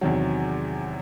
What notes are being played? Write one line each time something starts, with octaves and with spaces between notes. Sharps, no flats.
E2 C3 D#3 F#3